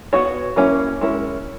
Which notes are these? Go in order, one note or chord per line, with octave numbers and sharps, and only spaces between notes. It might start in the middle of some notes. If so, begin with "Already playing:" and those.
B3 F#4 C#5
F#3 A#3 C#4 E4
G#3 C#4 E4 A#4